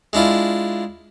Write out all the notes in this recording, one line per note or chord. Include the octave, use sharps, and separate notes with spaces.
G#3 D4 E4 F4